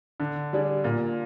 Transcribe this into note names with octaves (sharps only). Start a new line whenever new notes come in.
D3
G3 D4 G#4
A#2